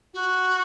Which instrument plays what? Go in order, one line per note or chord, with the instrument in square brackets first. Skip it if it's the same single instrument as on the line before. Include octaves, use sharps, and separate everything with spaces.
[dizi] F#4